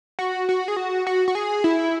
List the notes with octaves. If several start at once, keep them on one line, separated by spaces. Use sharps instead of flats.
F#4
F#4
G#4
F#4
F#4
F#4
G#4
E4